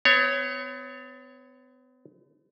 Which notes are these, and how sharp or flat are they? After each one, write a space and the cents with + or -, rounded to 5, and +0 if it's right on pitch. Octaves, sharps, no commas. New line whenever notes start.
B3 +40 C#5 +0